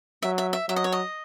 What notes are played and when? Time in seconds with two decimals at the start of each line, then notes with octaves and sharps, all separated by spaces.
0.22 F#3 E5
0.38 E5
0.53 E5
0.69 F#3 E5
0.76 D#5
0.84 C#5
0.92 D#5